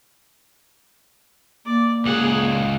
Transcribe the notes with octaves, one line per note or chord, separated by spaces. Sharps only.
A#3 D5
C#2 G#4 F#5